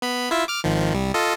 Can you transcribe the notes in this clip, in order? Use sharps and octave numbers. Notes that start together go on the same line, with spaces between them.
B3 B5
E4 F4 E5
D6 F6
G#1 D#3 F3
C2 G3
F4 A4 D#5